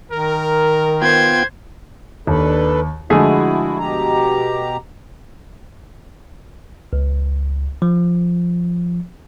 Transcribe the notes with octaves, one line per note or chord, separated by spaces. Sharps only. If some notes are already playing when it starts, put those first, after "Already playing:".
D#3 A#4
B3 F4 C5 G5 G#6
D#2 D4 A4 B4
D3 F3 G#3 A3 E4 F#4 G#4
B2 G4 A#5
C#2
F3